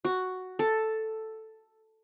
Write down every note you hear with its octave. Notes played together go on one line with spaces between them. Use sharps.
F#4
A4